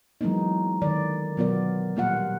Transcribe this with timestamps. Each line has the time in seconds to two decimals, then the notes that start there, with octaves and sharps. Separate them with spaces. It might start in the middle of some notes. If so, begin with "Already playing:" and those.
0.21 E3 F#3 G#3 A#3 B3 D#4
0.81 D3 D#3 D5
1.37 B2 F#3 B3 F4 A#4 D5
1.96 A#2 G3 A#3 F4 F5 F#5